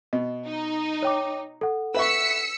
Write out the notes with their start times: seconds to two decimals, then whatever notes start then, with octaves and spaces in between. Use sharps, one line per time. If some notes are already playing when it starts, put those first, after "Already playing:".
0.13 B2 D#5
0.45 D#4
1.02 C#5 G5 D6
1.61 A4 F#5
1.94 B4 E5 C#6 E6 B6 C#7